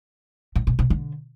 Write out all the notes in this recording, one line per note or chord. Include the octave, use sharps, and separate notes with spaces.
A2
A#2
C3
D3